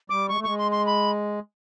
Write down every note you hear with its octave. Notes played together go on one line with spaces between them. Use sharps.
G3 D6
G#3 C#6
A3
G#3 C#6
C6
C6
B5